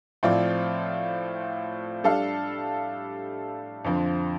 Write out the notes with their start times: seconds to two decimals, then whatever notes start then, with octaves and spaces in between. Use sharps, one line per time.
0.23 A2 F3 C4 F4 D5
2.04 G3 D4 A4 F5
3.84 F2 D3 F3